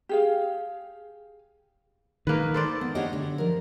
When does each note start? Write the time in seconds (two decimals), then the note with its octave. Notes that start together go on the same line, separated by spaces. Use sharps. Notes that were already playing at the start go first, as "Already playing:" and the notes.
0.09 G4 G#4 F5
2.27 D#3 A#3 B4
2.54 A4 C5 D5
2.81 B3
2.95 A3 D4 G4 C#5 D#5 F#5
3.13 D3
3.38 F3 A#4